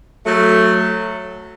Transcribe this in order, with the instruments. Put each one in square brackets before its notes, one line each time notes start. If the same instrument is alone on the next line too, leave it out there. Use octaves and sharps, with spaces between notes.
[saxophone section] F#3 A3